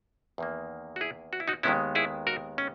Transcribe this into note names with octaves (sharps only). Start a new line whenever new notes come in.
E2 D#3 A#3
F#4
E4 G#4
F#4
E4
D#4 F#4
D#2 D#3 G#3 B3 C#4 E4
E4 G#4
F#4 A#4
C#4